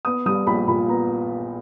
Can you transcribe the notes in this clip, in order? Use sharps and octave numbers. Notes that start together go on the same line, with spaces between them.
B3 D#6
G3 D#6
A#1 B5
A#2 B5
B3 A#5